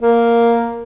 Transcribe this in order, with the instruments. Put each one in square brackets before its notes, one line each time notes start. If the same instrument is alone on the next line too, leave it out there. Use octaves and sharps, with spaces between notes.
[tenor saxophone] A#3